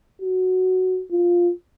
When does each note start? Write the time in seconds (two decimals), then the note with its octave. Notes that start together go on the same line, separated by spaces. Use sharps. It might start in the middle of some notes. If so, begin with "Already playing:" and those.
0.22 F#4
1.11 F4